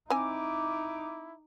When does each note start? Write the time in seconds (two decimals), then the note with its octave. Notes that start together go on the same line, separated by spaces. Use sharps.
0.10 C4 D#4 E4 G#5 D6